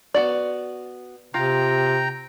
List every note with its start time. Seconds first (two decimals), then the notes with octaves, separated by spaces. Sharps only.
0.14 B3 F#4 D5
1.34 C3 F4 G5 A#5